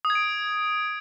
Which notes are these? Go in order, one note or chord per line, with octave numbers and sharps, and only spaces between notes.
D#6
G#6
D7